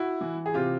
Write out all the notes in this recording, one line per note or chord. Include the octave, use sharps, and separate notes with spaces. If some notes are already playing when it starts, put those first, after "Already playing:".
Already playing: E4 F#4
E3
G#4
C3 F4 G4